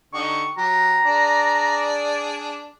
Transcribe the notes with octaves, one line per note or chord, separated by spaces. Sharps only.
D3 D#4 G4 C#6
F#3 G4 A#5
D4 G#4 D5